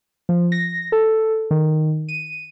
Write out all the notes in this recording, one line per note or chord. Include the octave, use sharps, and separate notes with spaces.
F3
A#6
A4
D#3
D#7